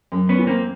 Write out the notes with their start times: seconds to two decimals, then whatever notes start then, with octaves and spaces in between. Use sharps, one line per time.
0.12 F#2
0.29 B3 C#4
0.39 E3
0.47 A#3 C4